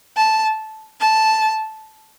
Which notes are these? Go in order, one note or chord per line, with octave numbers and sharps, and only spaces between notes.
A5
A5